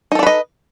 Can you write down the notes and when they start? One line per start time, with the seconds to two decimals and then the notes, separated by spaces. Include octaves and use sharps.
0.12 D#4
0.15 A4
0.19 D4
0.23 B4
0.27 D#5